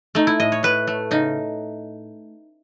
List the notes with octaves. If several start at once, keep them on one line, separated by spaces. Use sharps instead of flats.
A3 D#4
E4
A2 D#5
C#5
A2 B4
A3
C#3 D#4